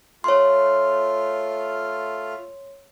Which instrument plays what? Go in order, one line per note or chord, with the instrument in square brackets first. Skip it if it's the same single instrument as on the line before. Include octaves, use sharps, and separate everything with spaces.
[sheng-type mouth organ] A3 F4 F6 [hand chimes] C#5 C6